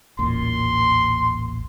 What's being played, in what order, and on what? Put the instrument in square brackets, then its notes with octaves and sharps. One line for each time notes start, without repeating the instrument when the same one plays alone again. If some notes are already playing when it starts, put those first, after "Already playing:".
[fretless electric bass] D#1 A1 A#2 [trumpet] C6